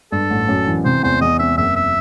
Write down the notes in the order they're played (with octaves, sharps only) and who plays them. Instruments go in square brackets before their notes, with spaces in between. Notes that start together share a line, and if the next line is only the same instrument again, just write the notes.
[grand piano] G2 [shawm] A4
[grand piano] A1
F#2
E3
[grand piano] C3 [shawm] C5
[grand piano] E2 [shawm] C5
[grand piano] E2 [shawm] D#5
[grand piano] C4 [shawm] E5
[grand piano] F#1 [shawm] E5
[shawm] E5